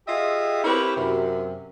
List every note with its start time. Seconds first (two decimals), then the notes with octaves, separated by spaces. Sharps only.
0.07 F4 G4 G#4 D#5 E5
0.64 C4 E4 G4 A#4 B4 C#5
0.97 F#2 C3